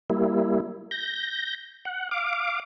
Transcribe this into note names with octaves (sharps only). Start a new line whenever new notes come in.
G3 A#3 E4
G6 A#6
F#5
F5 D6